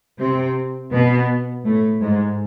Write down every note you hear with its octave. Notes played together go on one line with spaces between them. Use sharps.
C3 C4
B2 B3
A2 A3
G#2 G#3